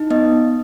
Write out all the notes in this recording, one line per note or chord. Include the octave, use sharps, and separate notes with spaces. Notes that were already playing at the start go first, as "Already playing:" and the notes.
Already playing: D#4
B3 D#5